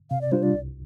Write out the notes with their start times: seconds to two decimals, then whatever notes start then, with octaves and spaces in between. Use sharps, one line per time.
0.11 C3 F5
0.21 D5
0.31 G3 D4 F4 C5
0.43 D5
0.54 C2